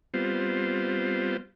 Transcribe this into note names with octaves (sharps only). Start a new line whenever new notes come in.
G3 B3 C4 F4 C5